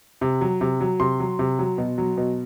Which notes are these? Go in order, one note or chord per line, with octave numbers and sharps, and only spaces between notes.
C3
F#3
C3
F#3
C3 C6
F#3
C3
F#3
B2
F#3
B2